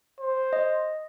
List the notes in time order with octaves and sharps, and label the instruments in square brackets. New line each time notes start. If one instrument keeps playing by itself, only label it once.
[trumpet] C5
[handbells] D#5